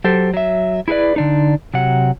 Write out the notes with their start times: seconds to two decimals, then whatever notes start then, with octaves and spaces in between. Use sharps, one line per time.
0.04 F#3 G4 A4 C5
0.34 F#3 E5
0.88 E4 G#4 A4 B4 D5
1.16 D3 D4 D#4
1.74 C3 F#3 F#5